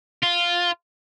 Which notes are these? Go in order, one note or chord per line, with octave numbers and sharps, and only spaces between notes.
F4